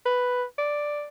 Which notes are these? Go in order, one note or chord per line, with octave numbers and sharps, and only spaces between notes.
B4
D5